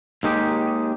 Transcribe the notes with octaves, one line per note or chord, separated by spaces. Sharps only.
D#2 D#3 G#3 D#4 G4